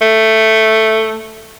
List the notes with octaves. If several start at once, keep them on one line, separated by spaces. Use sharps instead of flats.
A3